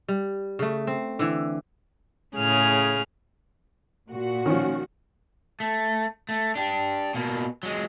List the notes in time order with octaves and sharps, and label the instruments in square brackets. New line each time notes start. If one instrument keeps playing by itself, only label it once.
[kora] G3
C#3 A3
C4
D3 E3
[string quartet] A2 C#3 G#4 F6
[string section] A#2 F#4
[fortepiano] D#3 F3 [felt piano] C#4
[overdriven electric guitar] A3
A3
D4 G4
B2 A#3
F#3 G#3